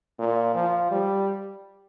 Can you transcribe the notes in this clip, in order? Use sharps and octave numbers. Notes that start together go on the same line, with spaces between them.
A#2
F3
G3